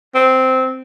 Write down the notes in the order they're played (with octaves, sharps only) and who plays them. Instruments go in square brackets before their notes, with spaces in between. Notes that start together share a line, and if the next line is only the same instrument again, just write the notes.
[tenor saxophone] C4